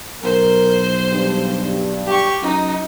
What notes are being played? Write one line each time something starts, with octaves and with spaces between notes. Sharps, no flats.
B1 A#4 C5
G2
G4 C#6
F#2 D#4